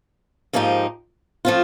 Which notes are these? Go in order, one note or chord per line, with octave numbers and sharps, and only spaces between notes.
G#2 F3 A#3 D#4 G4
F3 A3 C4 F4